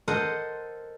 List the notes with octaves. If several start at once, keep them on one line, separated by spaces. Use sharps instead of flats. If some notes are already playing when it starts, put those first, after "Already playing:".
A4 A#4 C5 D#5 F#5